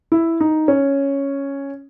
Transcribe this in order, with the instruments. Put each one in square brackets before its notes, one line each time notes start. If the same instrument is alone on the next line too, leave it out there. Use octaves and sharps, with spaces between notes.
[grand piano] E4
D#4
C#4